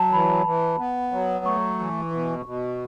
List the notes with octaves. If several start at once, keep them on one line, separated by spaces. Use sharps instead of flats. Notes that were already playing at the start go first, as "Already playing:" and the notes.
Already playing: F#3 A5
E3 B5
E3
B3
F#3
A3 C#6
E3
B2
B2